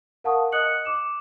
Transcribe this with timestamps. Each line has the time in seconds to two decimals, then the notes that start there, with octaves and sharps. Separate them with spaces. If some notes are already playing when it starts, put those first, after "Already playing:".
0.24 A#4 F5 F#5 A5 C#6 D#6
0.52 D#5 D#6 F#6 C#7 F#7
0.85 D6 E7